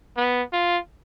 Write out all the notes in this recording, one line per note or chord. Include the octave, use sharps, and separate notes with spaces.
B3
F4